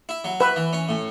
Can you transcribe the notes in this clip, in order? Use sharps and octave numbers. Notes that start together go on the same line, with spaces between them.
E4
F#3
E4 B4
E3
C#4
A2